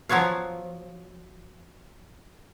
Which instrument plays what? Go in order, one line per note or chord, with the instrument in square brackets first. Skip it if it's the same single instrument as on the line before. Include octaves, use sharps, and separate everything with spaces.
[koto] F3 F#3 B3 C#5 F5